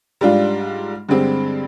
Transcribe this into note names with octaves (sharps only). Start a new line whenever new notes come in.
G#2 G3 D4 F4
G2 D3 G#3 C4 G4